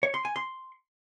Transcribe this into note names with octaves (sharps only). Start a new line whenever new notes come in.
C#5
C6
G#5
C6